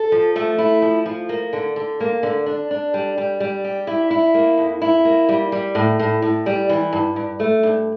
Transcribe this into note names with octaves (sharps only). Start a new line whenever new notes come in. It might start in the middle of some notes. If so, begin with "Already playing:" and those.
Already playing: A4
F3
A3
E4
F3
F3
A#3
D3
D3
A#3
D3
D4
D4
G3
G3
G3
G4
E4
E4
A#3
F2
E4
A#3
G3
G3
A2
A2
A2
G3
E3
G2
G2
A3
G2